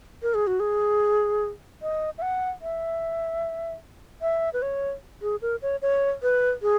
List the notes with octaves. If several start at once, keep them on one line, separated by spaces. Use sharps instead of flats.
A#4
G#4
F#4
G#4
D#5
E5
F#5
E5
E5
B4
C#5
G#4
A#4
C#5
C#5
B4
G#4